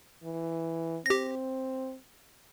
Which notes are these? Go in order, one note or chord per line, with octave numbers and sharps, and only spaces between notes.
E3
C4 G4 A#6